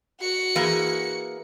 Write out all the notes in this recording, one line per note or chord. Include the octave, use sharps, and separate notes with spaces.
F#4 C#7
E3 A#3 G#4